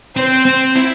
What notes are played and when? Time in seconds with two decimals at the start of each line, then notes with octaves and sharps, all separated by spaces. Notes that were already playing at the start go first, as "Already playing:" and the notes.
0.16 C4 C5
0.45 C4
0.75 E4